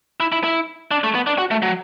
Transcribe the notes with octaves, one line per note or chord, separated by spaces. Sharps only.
E4
E4
E4
D4
A3
B3
D4
F#4
A3
F#3